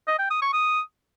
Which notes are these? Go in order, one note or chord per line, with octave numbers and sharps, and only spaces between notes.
D#5
G5
D#6
C#6
D#6